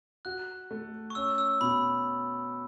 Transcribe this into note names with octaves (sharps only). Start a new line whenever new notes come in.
F#4 F#6
A3
C#6
C#4 E6
E6
B2 B5